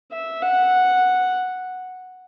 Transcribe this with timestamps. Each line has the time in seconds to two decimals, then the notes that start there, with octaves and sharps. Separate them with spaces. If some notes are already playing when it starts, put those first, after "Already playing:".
0.13 E5
0.42 F#5